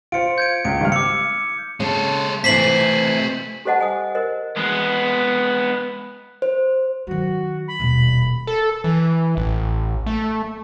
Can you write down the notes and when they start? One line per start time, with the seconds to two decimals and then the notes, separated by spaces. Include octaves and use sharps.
0.12 F4 C5 C#7 D7
0.38 G6 G#6 D7
0.65 C#2 D7
0.80 G#1 G3 F6
0.92 D6 E6 C#7
1.80 C#3 G#3 A4
2.44 C3 E3 A3 C4 B6 C7 F#7
3.65 G4 A4 C5 D#5 F#5 A5
3.80 G#5 D#6
4.15 A#4 C5 D#5
4.57 G#3 B3
6.42 C5
7.07 D#3 F#3 F#4
7.68 B5
7.80 D#1 B2
8.47 A4
8.84 E3
9.37 A1
10.06 A3